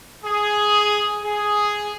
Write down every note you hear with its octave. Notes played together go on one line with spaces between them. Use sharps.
G#4
G#4